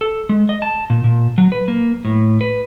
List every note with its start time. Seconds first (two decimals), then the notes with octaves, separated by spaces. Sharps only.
0.01 A4
0.29 G#3
0.49 D#5
0.62 A5
0.90 A#2
1.04 A#2
1.38 F#3
1.52 B4
1.68 A#3
2.05 A2
2.41 B4